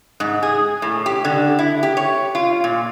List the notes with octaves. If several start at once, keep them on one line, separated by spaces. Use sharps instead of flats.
G#2
G#4
A2
G4
D3
E4
G4
C#5
F4
A#2